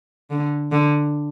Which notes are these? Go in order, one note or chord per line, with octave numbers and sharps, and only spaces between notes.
D3
D3